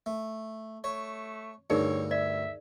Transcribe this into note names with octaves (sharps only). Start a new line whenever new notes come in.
A3
A3 C#5
D2 G2 D3 D#4 G#4 A#4 C#5
D5 E5